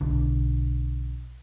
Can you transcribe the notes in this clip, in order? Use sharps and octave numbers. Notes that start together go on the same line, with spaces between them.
B1 D3